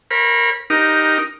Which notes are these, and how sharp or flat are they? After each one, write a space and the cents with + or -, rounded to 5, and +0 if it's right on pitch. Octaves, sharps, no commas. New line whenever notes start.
A#4 +0 C#5 -45 B5 -20
D#4 +0 G4 -5 A#4 +15